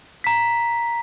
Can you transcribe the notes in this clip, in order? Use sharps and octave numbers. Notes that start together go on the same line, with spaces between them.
A#5 B6